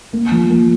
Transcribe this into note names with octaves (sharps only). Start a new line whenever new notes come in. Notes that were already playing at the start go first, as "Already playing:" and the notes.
A#3
F3
A#3